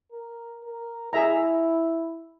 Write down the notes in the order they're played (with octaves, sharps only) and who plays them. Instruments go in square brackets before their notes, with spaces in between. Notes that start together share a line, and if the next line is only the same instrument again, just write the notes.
[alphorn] A#4
A#4
[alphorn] E4 [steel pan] G#4 E5 A#5